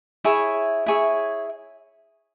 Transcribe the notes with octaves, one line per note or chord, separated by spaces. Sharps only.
E4 G#4 C#5 E5
E4 G#4 C#5 E5